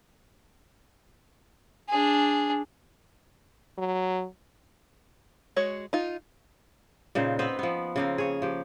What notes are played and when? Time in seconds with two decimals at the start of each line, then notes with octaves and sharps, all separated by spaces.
1.89 D4 G#4
3.78 F#3
5.56 G#3 F#4 C#5
5.93 D#4 F4
7.15 A#2 C#3 D#4 C5
7.39 B3 C4 B4 C5
7.59 F3 B3
7.96 C#3 A#3 C4
8.18 G#4 C#5
8.42 F3 G4